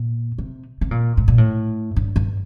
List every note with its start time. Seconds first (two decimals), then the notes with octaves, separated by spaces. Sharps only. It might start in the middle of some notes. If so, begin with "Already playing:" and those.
Already playing: A#2
0.38 C3
0.81 C3
0.91 A#2
1.17 A2
1.28 A#2
1.38 A2
1.96 G2
2.16 G2